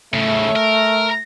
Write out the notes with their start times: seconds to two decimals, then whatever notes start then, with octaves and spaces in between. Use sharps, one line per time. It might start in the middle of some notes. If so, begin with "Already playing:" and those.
0.13 A2 C#3 A3
0.56 A#4